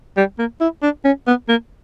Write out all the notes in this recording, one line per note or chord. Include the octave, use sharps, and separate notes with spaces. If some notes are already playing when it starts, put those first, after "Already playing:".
G3
A#3
E4
D4
C#4
B3
A#3